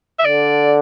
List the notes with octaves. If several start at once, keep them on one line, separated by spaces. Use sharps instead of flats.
E5
D3 D5